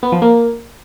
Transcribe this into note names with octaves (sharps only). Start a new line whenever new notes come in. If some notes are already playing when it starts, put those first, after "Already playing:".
B3
F3
A#3